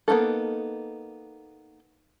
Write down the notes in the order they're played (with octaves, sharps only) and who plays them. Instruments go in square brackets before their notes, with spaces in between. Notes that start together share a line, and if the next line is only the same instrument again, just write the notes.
[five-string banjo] A#3 B3 C#4 D#4 A4